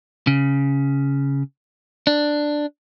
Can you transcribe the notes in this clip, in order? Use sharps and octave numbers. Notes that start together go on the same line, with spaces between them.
C#3
D4